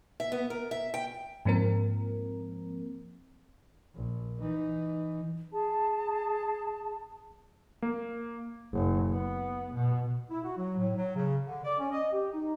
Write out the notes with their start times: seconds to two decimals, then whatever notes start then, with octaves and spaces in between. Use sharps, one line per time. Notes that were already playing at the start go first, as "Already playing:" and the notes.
0.20 E5
0.32 B3
0.50 A#4
0.71 E5
0.94 G5
1.45 G#2 F3 A#3 C4 A#4
3.94 A#1
4.40 E3 D#4
5.53 G#4 A5
7.82 A#3
8.73 F#1
9.11 B3
9.73 B2
10.30 E4
10.44 F#4
10.57 F#3
10.77 A2
10.96 F#3
11.16 C#3
11.46 D3
11.63 D5
11.79 C#4
11.91 D#5
12.12 G4
12.32 D#4